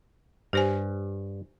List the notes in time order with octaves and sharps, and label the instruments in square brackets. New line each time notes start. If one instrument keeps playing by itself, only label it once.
[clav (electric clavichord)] G2 [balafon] G4 C5 G#5